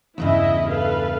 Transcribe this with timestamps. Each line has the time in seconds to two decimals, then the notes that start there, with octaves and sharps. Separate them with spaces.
0.18 E2 G2 C#3 E4 D#5 E5
0.69 A4 B4 F5